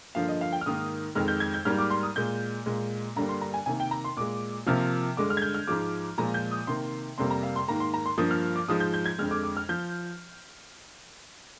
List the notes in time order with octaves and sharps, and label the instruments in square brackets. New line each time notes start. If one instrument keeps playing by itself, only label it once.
[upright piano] G2 D3 F3 A#3 F5
D#5
F5
G5
F6
G#2 D#3 A#3 D#6
F2 D#3 G#3 F6
G6
G#6
G6
G#2 G3 A#3 F6
D6
C6
D#6
A#2 G#3 G6
A#2 G#3
G2 D3 G3 A#3 A#5
C6
A#5
G#5
C3 D#3 A#3 G#5
G5
A#5
C6
A#2 G#3 D6
C3 F3 A#3 F6
G2 D3 G#3 D6
F6
G#6
G6
F6
G#2 F3 G#3 D6
A#2 F3 G#3 A#5
G6
D#6
C3 D#3 A#3 C6
F2 C3 G3 A#3 C6
A#5
F5
C6
G#2 D#3 A#3 A#5
C6
A#5
C6
G2 F3 A#3 D#6
F6
D6
G#2 F3 G#3 D#6
G6
G6
G#6
F2 D3 G#3 F6
D6
D6
F6
F3 G6